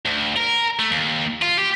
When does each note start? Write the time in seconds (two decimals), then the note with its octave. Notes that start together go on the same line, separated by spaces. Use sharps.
0.05 D2
0.36 A#4
0.79 A3
0.91 D#2
1.42 F4
1.59 G4